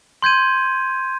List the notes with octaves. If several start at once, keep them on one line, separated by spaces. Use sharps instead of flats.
C6 G6 G#6 D#7